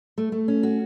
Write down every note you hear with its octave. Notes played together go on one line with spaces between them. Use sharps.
A3
A3
C#4
F#4